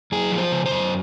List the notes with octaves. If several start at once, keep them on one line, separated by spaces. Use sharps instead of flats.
F#2 G#4
F3
C5
C#3
C5
F#2